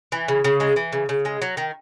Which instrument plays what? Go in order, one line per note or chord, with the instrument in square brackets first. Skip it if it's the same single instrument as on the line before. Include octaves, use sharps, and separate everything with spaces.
[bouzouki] E3
C#3
C#3
G#3
E3
C#3
C#3
G#3
F#3
D#3